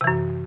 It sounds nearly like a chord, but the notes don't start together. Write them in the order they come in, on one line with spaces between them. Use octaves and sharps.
C3 E3 F#2